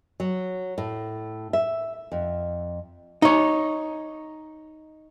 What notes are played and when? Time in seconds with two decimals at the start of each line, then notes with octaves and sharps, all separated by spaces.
0.20 F#3
0.78 A2
1.53 E5
2.12 F2
3.22 D#4 C#5